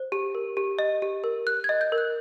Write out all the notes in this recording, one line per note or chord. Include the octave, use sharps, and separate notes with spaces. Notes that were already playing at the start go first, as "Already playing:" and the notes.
Already playing: C5
G4
A#4
G4
D#5
G4
A#4
A#4 F#6
G#6
D#5
G6
A#4
F#6